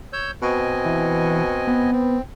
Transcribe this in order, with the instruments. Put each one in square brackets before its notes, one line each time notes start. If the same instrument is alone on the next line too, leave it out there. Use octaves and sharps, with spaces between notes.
[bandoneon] C#5 E6 G6
[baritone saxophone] B2 [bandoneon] C4 D#5 G#5
[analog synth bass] E3
B3
[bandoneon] C4